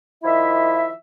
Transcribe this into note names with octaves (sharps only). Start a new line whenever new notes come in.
D#3 F3 E4 E5